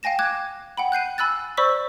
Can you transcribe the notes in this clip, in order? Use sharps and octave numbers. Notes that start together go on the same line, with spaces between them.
F5 G5 G#5 A#6 E7
D6 F#6 G#6 E7
F#5 G5 B5
F#6 G6 C7 D#7
G#5 B5 E6 F#6 A6
C5 D5 B5 C#6 E6 B6